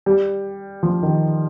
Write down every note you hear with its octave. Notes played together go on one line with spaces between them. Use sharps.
G3
F3
D#3